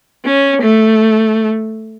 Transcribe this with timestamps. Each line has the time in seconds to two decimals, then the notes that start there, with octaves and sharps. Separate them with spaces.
0.25 C#4
0.62 A3